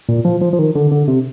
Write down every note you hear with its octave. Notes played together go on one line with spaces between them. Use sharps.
A#2
F3
F3
F3
D#3
D3
D3
C3